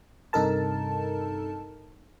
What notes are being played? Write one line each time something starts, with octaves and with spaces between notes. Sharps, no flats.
G2 C3 D#4 A4 A#4 A5